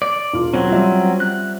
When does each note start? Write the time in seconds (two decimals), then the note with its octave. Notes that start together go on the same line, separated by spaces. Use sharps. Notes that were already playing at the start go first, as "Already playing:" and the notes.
0.02 D5
0.34 E1 F4 F5
0.54 F#3 C4 C#4
0.71 F3 G3 E5
1.20 F#6